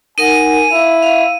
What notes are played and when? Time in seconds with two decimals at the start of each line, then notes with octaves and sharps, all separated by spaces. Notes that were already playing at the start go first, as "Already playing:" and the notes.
0.18 D#4 A#4 F#5 G#5 D#7
0.71 E4 F5
1.02 F5